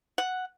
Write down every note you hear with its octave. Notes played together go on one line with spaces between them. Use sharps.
F#5